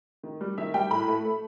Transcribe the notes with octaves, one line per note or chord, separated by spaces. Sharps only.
D#3
G3
D#3 E5
G3 G5
A2 B5
A3
A3